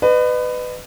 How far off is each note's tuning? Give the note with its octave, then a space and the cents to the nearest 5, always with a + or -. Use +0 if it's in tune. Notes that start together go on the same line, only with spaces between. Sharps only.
B4 +20 D#5 -40